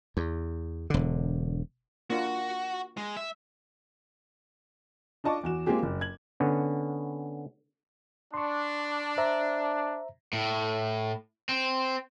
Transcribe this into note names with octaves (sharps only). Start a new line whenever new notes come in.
E2
E1 D3
A#3 D4 F4 F#4
G#3
E5
D4 F4 D#5 A5 C#6 D6
E2 F#4 E7
G#3 A#3 C4 F4 G4 G#4
F#1
G#6 F#7
D3 B3 C#4
D4 C6 C#6
C5 E5 A#5
A2
C4